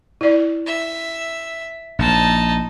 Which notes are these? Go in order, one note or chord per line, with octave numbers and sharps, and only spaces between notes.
E4 D5
E5
A#1 D#4 A5